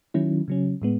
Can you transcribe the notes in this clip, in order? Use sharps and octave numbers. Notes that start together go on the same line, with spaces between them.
D#3 F#3 C#4 E4
C#3 F#3 C#4
A2 G#3 B3